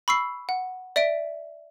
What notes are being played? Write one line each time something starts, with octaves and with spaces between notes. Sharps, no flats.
B5 C#6 E6 C7
F#5
D5 E5 B6 D7